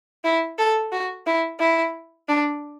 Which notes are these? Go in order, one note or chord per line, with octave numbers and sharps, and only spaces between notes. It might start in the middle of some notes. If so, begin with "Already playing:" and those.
E4
A4
F#4
E4
E4
D4